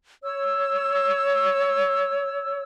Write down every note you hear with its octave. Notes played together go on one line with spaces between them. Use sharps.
C#5 E6